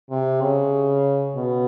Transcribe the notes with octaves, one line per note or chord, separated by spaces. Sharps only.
C3
C#3
B2